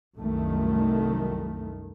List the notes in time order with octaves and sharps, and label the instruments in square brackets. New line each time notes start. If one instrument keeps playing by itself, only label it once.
[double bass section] C2 F#2 D#3 A3